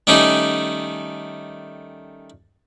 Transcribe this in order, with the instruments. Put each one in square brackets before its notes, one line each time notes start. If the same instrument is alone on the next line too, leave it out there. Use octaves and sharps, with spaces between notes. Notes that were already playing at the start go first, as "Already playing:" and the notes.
[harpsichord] D#3 G3 A3 C#4 D#4